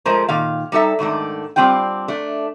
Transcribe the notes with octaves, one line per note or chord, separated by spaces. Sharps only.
F3 G#3 A3 G#4 A#4 C5
A#2 D#3 F5
G3 D#4 A4 E5
G#2 D#3 A3 D4
G3 C4 D4 F4 G5
A3 D4